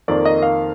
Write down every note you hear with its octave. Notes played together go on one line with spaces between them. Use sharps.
F2 D#3 A#3 D5
D#5
F5